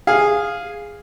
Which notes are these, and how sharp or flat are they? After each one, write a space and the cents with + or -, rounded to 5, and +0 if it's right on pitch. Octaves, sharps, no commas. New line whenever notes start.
G#4 -10 F5 +0